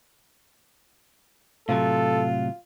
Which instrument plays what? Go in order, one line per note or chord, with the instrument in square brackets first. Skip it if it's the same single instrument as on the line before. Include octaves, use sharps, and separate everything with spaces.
[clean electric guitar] A2 C3 F#3 [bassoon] F4 [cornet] A4